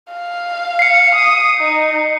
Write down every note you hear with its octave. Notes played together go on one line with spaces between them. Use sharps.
F5
C7 C#7
D#6
D#4